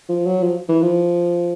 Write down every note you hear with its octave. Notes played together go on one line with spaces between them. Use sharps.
F3
F#3
F3
E3
F3